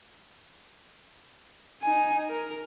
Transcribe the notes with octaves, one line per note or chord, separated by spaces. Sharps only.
D#4 G#5
A#4